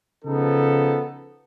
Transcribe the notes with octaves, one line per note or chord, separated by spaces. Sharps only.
C#3 F3 B3 D#4 A4